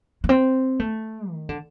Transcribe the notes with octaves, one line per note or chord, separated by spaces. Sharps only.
A#3
C4
A3
D#3
D3